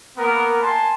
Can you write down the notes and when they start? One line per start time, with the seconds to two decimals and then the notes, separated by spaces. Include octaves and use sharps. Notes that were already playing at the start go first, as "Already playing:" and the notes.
0.17 A#3 B3 A#4
0.61 G#5 A5 C6